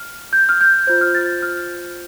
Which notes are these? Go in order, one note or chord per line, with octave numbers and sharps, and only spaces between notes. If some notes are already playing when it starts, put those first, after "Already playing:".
Already playing: F6
G6
F6
G6
F4 C5 G6
F6
A6
F6